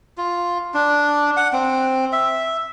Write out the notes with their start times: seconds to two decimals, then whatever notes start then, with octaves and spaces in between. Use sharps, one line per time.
0.17 F4
0.74 D4
1.37 F#5
1.52 C4
2.12 E5